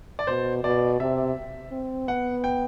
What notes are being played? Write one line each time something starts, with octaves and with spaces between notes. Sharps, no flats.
D5
B2 C5
B2 D5
C3 E5
C4
B3 F#5
G5